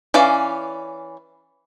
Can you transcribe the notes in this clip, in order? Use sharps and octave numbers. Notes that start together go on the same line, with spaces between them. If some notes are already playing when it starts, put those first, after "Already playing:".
E3 C#4 D5 F5